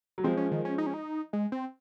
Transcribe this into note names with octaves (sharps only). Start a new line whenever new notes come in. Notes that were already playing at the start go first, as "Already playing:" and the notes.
F#3
F3 G#3 C4
C#4
D#3
C#4
D#4
C#4
D#4
G#3
C4